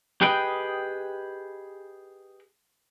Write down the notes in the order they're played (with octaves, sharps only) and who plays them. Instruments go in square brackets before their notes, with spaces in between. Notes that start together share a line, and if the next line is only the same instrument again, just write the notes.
[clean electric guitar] G4 G#4 B4 D#5 G5